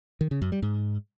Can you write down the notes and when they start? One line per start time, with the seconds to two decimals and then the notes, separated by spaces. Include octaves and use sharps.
0.21 D#3
0.31 C#3
0.42 F#2
0.52 G3
0.62 G#2